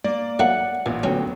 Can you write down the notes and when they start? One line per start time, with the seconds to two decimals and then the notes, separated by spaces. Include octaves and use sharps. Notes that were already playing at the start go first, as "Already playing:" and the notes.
0.04 A#3 D5
0.39 F#3 A3 A#3 F#5
0.86 A1 D#2 A#2
1.03 D2 F#3 B3 C#4 G5